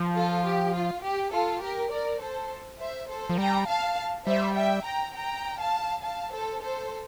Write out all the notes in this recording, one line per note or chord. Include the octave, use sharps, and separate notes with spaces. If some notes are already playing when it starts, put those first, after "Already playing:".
Already playing: F3
F4 A4
G4
F4
G4
F4 A4
G4 A#4
A#4 D5
A4 C5
C5 E5
A4 C5
F3
G3 G5 A#5
F5 A5
G3 C5 E5
E5 G5
G5 A#5
G5 A#5
F5 A5
F5 A5
A4 C5
A4 C5